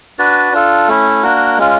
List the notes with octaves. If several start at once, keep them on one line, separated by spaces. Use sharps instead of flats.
D4 F#4 B4 D5
D4 F4 A4
A3 C#4 E4
A#3 D4 F#4 A#4
G#3 C#4 F4